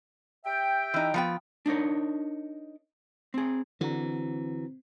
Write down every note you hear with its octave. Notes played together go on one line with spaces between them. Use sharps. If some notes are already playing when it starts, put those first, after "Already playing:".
G4 E5 G5
E3 D#4
F3 B3 G5
D4 D#4 A#4 C#5
C4 G#4
D3 E3 C4 F#4 A#5